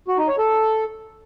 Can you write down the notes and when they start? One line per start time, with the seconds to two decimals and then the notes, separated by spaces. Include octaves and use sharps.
0.08 F#4
0.18 D#4
0.28 C#5
0.38 A4